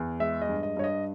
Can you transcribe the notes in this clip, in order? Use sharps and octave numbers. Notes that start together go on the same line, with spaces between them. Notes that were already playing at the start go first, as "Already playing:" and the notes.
Already playing: E2
G#3 E5
D#5
G2
D#5
G2 C#5
D#5